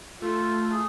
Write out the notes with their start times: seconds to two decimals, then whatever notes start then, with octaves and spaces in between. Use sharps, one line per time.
0.22 A3 F4
0.71 G#4